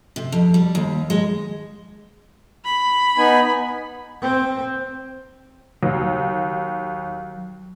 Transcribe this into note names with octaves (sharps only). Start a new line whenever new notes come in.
C3
F2
G3
D#2
G#3
B5
B3 D#4 G#5
C4
D#2 F#3